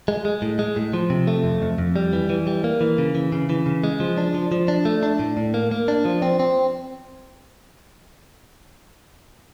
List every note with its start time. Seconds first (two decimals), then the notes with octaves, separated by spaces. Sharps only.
0.08 G#3
0.25 G#3
0.42 A2
0.59 G#3
0.76 A2
0.94 F3
1.10 C3
1.27 A3
1.44 F2
1.62 F2
1.78 F2
1.96 G3
2.13 E3
2.30 E3
2.47 G3
2.64 A#3
2.81 E3
2.98 C#3
3.15 E3
3.32 C#3
3.50 E3
3.66 C#3
3.84 G#3
4.00 F3
4.18 D4
4.34 F3
4.52 F3
4.68 D4
4.85 A3
5.03 D4
5.19 A2
5.37 A2
5.54 A#3
5.71 A#3
5.88 D4
6.05 F3
6.22 C4
6.40 C4